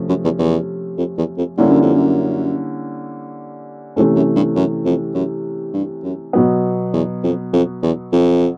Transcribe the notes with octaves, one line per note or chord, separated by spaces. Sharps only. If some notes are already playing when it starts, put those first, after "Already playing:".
Already playing: C3 F3 A3 C#4
F#2
E2
E2
F2
E2
F2
G2 D3 G3 A#3 C#4 E4
F#2
F2
F#2
F2 C3 E3 A3 C#4
F#2
G2
F#2
F2
F#2
G2
F#2
B2 F#3 B3
E2
F2
F2
E2
F2